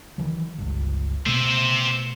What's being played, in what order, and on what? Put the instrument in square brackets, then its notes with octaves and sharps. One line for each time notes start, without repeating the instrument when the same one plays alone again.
[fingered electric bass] D#3 E3 F#3
G1 C#2
[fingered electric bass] B2 A3 [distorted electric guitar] C5 E5